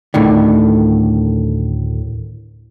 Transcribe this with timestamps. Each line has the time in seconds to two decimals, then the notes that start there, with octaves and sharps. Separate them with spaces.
0.14 D2 A2 D3 D#3